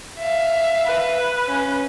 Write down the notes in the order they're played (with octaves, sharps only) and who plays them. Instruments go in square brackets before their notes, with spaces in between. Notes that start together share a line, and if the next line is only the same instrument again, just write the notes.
[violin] E5 F5
[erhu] B4
[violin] C#4